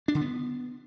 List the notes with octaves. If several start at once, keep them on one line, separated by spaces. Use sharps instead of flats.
D4
D3
B3